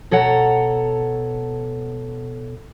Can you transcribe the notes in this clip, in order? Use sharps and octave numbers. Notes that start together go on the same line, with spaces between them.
B2 A4 C#5 F#5 A#5